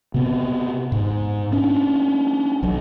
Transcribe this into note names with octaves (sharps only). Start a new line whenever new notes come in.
C3 B3 C4
G#2
C#4 D4
B1 F#3